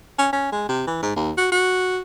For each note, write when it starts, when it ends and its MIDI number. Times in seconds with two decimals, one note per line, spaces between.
0.19 0.29 61
0.33 0.50 61
0.52 0.68 56
0.69 0.85 48
0.87 0.99 52
1.03 1.15 44
1.16 1.32 39
1.37 1.49 66
1.52 2.00 66